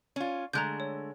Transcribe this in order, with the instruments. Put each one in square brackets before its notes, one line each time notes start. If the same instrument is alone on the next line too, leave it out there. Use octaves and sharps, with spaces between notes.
[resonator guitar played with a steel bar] C#4 F4
[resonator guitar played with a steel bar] D3 G#3 A3 [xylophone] A#5 F#6 G6
[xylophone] C#5